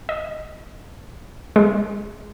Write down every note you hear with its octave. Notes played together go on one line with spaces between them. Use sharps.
D#5
G#3